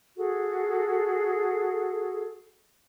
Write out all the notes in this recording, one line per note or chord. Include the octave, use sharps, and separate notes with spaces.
F#4 G#4 A4